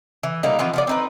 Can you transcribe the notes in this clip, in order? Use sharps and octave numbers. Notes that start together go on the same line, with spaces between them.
E3
B2 G3 A#3 D#4
E3 F3 B3 C4
F3 B3 D5
C4 D#4 B4